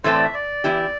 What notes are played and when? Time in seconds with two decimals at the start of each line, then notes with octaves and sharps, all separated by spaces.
0.04 A2 E3 A3 C4 C5
0.14 D5
0.24 E5
0.34 D5
0.64 E3 B3 E4 G4